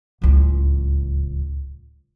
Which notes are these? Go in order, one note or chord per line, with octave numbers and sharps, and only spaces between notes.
D1 C#2